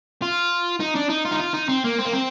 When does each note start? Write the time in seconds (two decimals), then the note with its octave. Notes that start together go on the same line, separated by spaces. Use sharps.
0.22 F4
0.80 D#4
0.95 D4
1.10 D#4
1.25 F4
1.32 D#4
1.39 F4
1.54 D#4
1.69 C4
1.84 A#3
1.99 C4
2.05 A#3
2.13 C4